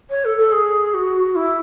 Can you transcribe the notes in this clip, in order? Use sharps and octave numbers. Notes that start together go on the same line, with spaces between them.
C#5
A4
A4
G#4
F#4
E4